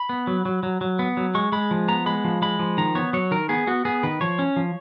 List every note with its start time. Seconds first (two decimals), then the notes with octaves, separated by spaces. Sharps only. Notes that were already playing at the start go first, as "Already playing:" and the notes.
Already playing: B5
0.09 B3
0.27 F#3
0.45 F#3
0.63 F#3
0.81 F#3
0.99 B3
1.17 F#3
1.35 G#3 C#6
1.52 G#3 B5
1.71 F3
1.88 B3 A#5
2.06 G#3 B5
2.24 F3
2.42 G#3 B5
2.59 F3
2.78 D#3 A#5
2.95 B3 C#5
3.13 F#3 C#5
3.31 D#3 A#4
3.49 B3 G#4
3.67 B3 F#4
3.85 B3 G#4
4.03 D#3 B4
4.21 F3 C#5
4.39 C#4
4.56 F3